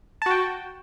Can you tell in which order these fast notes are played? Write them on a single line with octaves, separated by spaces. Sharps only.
A5 F#4 G5